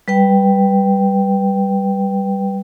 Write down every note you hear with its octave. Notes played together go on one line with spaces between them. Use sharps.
G3 B4 G5